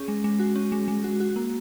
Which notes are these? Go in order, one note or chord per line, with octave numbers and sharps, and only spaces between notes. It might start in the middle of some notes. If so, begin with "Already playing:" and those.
Already playing: C#4 G#4
G#3
G#3
F#4
C#4
G#3
G#3
F#4
F#4
A#3